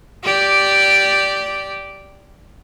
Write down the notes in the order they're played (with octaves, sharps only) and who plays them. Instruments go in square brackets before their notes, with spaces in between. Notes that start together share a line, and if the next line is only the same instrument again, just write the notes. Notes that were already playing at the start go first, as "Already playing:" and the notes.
[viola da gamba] G4 D5